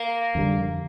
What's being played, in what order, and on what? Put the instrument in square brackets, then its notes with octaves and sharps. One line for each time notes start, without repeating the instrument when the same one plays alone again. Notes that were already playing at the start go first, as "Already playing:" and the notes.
Already playing: [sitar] A#3
[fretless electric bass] F2 D3 G3